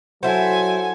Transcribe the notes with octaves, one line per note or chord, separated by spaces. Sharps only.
F#3 E4 A4 C5 F#5 G#5